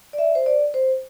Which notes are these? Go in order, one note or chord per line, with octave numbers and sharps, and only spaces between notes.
D5
E5
C5
D5
C5